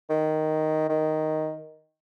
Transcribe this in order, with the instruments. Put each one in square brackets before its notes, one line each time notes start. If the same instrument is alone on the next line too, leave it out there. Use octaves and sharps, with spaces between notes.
[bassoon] D#3
D#3